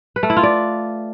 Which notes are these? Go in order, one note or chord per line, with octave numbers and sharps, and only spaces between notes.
B4
A3
E4
F4
D5